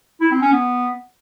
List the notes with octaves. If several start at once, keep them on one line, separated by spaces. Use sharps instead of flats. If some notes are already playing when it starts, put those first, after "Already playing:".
E4
C4
C#4
B3